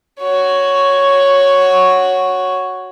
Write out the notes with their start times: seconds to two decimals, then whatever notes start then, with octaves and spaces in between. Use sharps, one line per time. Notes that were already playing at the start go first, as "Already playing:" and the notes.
0.20 F#4 C#5